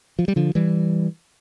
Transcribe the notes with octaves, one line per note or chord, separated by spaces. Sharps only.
F3
G3
D3 F3
E3 G3